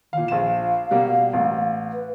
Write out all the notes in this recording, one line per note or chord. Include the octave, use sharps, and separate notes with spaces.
A#2 D#3 F5
A#1 F5 E7
B2 G3 A#3
A1
B4